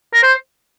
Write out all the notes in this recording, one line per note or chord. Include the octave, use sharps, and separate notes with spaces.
A#4
C5